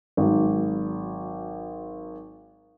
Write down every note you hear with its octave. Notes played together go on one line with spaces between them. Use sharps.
G#1 F#3